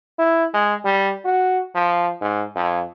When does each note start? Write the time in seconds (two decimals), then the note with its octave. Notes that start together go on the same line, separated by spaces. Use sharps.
0.19 E4
0.54 G#3
0.85 G3
1.25 F#4
1.75 F3
2.21 G#2
2.55 F2